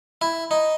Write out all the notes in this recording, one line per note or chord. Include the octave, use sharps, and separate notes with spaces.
E4
D#4